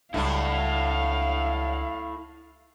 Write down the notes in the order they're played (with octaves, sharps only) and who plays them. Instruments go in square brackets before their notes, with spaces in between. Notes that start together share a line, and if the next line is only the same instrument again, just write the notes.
[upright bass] C#2 G3 [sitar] G2 F#3 [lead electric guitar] E4 A4 [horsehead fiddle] F5